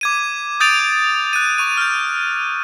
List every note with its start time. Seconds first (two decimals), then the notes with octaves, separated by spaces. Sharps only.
0.01 D6 G#6 D#7
0.60 D#6 G6 A6 D7 D#7 F7
1.33 F#6 D#7
1.58 C#6 D#7
1.77 F6 G6